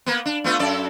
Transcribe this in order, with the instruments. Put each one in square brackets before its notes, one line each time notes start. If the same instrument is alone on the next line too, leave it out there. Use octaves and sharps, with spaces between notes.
[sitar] A#3 B3
D4
A3 B3 F4
F#2 A4 D5